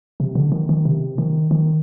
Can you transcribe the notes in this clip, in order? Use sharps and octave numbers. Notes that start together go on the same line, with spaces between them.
C3
D3
D#3
D#3
C3
D#3
D#3